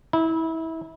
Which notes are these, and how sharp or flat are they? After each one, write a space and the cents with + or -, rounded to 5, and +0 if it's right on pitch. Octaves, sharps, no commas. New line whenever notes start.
E4 -25